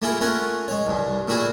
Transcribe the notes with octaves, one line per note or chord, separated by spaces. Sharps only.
A3 A#3 E4 F4 G#4 A#4
A3 C#4 F4 A#4 F#5 G#5
G#3 C#5
C2 G2
A#2 A3 E4 F#4 G#4